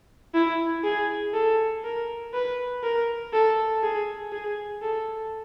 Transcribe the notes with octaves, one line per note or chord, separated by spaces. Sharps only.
E4
G#4
A4
A#4
B4
A#4
A4
G#4
G#4
A4